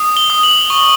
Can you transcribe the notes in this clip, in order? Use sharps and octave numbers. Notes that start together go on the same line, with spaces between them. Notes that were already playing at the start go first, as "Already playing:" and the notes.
Already playing: D#6
G7
D#6
F#7
C#6 G7